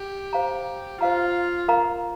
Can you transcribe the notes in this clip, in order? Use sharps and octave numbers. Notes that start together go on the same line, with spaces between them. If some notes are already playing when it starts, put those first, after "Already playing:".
Already playing: G4
C5 F5 A#5
F4 C5 F5 A#5
A#4 F5 A#5